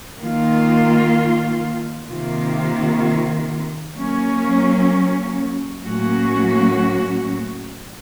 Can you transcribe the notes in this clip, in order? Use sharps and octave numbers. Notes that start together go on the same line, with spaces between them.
D#3 A#3 F4
C3 D#3 A#3 F4
F#3 A#3 C#4
A2 F#3 A#3 C#4 F#4